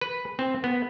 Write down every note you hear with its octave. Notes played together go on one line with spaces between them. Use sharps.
B4
C4
B3